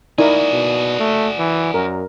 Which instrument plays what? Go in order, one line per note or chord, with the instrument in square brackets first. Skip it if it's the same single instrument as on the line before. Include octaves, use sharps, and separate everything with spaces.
[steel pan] D#4 E4 A#4 [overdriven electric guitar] F#4 G#4 [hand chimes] D5
[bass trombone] B2
A3
E3
[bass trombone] F#2 [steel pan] A#4